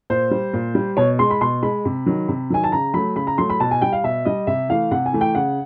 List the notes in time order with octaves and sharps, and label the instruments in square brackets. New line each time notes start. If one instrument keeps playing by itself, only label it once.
[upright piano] A#2 C5
G3
A#2
G3
B2 C#5
G#3 C6
B5
B2 C6
G#3 B5
C3
D#3 F#3
C3
D#3 F#3 G#5
A5
C#3 A#5
F#3 A3 B5
C#3 B5
A#5
F#3 A3 C6
B5
B2 A5
G#5
G3 G5
F5
B2 E5
G3 D#5
C3 E5
E3 A3 F5
C3 F#5
G#5
E3 A3
G5
C#3 F#5